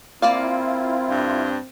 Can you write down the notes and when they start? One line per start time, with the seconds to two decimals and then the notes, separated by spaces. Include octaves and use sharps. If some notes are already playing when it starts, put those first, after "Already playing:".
0.22 A#3 C4 E4 F4 D5 F5
1.10 G2